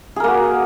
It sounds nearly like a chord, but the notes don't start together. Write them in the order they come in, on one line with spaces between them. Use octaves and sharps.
G#4 A#4 A#3 F#4